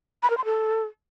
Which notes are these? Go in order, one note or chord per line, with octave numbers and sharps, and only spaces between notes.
B5
A#4
C6
A4